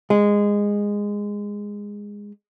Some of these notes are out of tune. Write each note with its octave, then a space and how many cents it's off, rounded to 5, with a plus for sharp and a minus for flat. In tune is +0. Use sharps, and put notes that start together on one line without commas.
G#3 -15